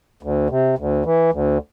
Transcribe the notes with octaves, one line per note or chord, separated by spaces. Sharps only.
D2
C3
D2
E3
D2